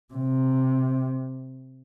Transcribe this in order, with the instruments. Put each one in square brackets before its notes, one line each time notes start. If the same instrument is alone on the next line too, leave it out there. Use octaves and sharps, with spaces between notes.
[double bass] C3